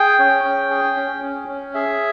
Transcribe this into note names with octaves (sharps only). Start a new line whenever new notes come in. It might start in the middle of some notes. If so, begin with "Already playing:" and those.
Already playing: G#4 G5
C#4
C#4
G#4
C#4
C#4
C#4
G#4 E5